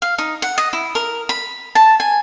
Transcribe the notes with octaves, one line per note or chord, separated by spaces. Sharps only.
F5
D#4
F#5
D#5
E4
A#4
B5
A5
G#5